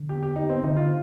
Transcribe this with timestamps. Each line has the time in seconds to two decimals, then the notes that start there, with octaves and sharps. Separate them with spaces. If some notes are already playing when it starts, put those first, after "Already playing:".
Already playing: D3
0.09 G4
0.23 G4
0.36 D#4
0.49 C4
0.64 D3 D#4
0.76 F4